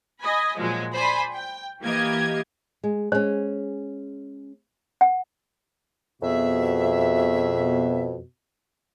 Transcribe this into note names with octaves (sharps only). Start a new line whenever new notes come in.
D#5 G#5 B5
A#2 F3 F#3 G#3
C5 D5 G#5 B5
G5
E3 A#3 G4 D#5 G#6
G#3
G#3 C#4 C5
F#5
F2 B2 F#4 G#4 E5